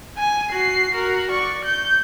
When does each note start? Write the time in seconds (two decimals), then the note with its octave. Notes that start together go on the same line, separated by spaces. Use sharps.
0.18 G#5
0.52 F#4 C7
0.91 F#4 A#4
1.31 D5 C#6
1.65 G6